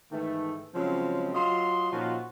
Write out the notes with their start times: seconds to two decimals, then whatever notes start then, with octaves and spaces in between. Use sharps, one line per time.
0.12 G#2 D#3 E3 A3
0.74 C#3 F3 F#3 G#3 C4
1.35 F#3 F4 D#5 C6
1.92 A#2 F3 C#4 D#4 F4 F#4